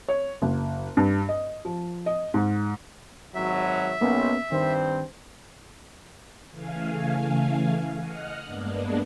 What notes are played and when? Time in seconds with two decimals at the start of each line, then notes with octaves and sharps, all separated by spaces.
0.08 C#5
0.42 F#1
0.97 G2
1.29 D#5
1.65 F3
2.06 D#5
2.34 G#2
3.35 G#1 F#3 E5
4.01 B1 A#3 B3 C#4
4.52 G2 D#3 C4 C5
6.50 C#3 E3 A3 F5 G#5
7.99 D#5 F#5 D#6 F6 F#6
8.43 G2 G#3 A#3 B3 D4